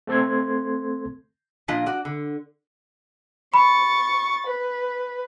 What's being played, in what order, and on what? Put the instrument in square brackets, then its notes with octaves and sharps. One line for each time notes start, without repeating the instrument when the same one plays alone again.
[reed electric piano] A3 C4 A4 C6 G#6
[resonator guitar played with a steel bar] A#2 F3 D4 F4 D#5
F#4 D5
D3
[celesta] B5 [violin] C#6 A6
[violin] B4